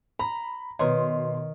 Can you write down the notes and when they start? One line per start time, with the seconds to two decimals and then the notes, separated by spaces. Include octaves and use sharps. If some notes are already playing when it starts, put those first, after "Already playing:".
0.19 A#5 B5
0.79 B2 D#3 B4 C#5 C6